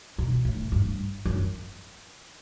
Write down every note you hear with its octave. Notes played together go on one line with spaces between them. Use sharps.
B2
A2
G2
F#2